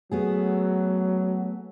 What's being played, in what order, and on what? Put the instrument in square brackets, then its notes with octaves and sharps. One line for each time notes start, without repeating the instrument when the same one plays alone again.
[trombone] F#3 [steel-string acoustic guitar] A3 B3 G#4